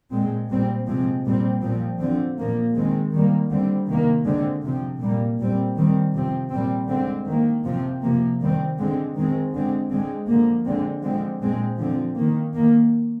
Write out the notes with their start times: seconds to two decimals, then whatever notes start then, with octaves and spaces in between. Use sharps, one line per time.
0.11 A#2 G#3 C4
0.49 A#2 G3 C4
0.87 C3 F3 G#3 C4
1.25 A#2 G3 C4
1.62 A#2 F3 C4
1.99 D3 F3 C4
2.37 A#2 F3 A#3
2.75 D#3 G#3 C4
3.13 D#3 G3 A#3
3.51 D3 G3 C4
3.88 C3 D#3 A#3
4.25 D3 G#3 C4
4.63 C3 F3 C4
5.00 A#2 G3 A#3
5.39 A#2 G3 C4
5.76 D#3 G3 C4
6.14 C3 F3 C4
6.51 A#2 G3 C4
6.89 D3 G#3 C4
7.27 D#3 A#3
7.65 C3 F3 C4
8.02 C3 F3 A#3
8.40 D#3 G3 C4
8.78 D3 G#3 C4
9.15 D#3 G#3 C4
9.53 D3 G#3 C4
9.90 D3 G#3 C4
10.28 D3 F3 A#3
10.65 D3 G#3 C4
11.03 D3 F3 G#3 C4
11.42 A#2 G#3 C4
11.79 D3 F3 C4
12.16 D#3 A#3
12.54 D#3 A#3